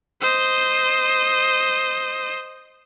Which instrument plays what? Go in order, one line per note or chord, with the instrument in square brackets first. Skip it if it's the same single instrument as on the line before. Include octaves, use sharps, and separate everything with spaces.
[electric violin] C5 D#5